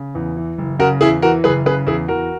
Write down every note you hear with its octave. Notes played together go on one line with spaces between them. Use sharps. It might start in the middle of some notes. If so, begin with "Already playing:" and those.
Already playing: C#3
E2
E3
F#1
C#3 F#4 A#4
E2 E4 G#4
E3 F#4 A#4
F#1 G#4 B4
C#3 G#4 B4
E2 E4 G#4
E2 F#4 A#4